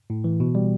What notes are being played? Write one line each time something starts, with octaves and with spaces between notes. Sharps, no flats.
A2
E3
B2
G3